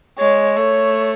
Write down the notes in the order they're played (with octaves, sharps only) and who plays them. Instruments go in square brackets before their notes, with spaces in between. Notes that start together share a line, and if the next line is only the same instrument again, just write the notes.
[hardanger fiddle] G#3 [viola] C#5
[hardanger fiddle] A3 [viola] C#5